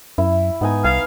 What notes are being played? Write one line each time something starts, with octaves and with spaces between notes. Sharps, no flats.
F#2 E4
G#2 B3 D#4 G#5
C2 F5 G#5